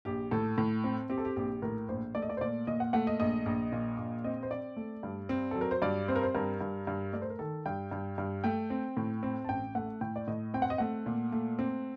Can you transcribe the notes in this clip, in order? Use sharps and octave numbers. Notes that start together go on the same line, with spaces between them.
A#1 G4
A2 A4
A2
C4
C4 G4
A4
G4
A#1 G4
A2 A#4
A#1 C5
A3 D5
D#5
D5
C5
A#2 D5
A#2 D#5
F#5
A3 F#5
D#5
A#1 D#5
A#1
A#2
A#1
C4 D#5
C5
C4 D5
A3
G2
C4
F#3 A4
A#4
C5
G2 D5
C4 C5
A#4
C5
G2 A#4
G2
G2
A3 D5
C5
A#4
D#3 A4
G2 G5
G2
G2
A3 G5
C4
A2
C4
A5
A1 G5
A3 F#5
A2 G5
D5
A2 D#5
C4 G5
F#5
D#5
A3 F#5
A#2
A3
C4